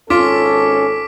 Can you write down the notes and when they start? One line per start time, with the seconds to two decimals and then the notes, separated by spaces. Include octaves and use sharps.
0.10 G#1 C#4 F4 A4 D6 B6 D7